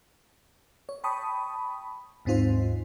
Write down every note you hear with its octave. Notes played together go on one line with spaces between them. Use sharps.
C#5
G5 A5 B5 C#6 D#6
D#2 G#2 C4 D#4 F4 C5